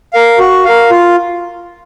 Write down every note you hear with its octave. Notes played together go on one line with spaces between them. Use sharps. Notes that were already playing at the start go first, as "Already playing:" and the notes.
A#4 F5
F#4
A#4 F5
F4